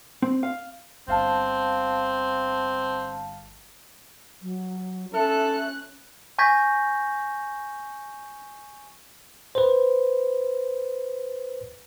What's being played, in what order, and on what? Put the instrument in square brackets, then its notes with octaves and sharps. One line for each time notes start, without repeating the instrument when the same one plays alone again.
[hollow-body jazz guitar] C4
F5
[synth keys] G1 F5 A5 [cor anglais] C4
[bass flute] F#3
[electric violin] C#4 F#6 [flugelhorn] A4 [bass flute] E5
[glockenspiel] G#5 C#6 G6 G#6 A#6 B6
[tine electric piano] B4 C5